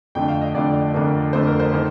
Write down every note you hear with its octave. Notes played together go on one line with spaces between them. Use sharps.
F2 D3 A3 D4 G5
F5
D#5
F2 D3 A3 D4 D5
F2 D3 A3 D4 A#4
F2 D3 A3 D4 C5
A#4
C5
D#3 C5